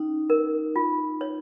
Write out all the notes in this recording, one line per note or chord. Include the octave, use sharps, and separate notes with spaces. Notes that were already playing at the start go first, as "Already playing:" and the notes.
Already playing: C#4 D#4
A#4
F4
C#5